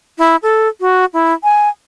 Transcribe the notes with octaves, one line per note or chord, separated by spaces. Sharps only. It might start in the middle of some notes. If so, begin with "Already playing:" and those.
E4
A4
F#4
E4
G#5